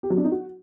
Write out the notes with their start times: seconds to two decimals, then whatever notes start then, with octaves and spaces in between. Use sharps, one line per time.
0.03 G4
0.10 F#3
0.17 D4
0.24 D#4
0.31 F#4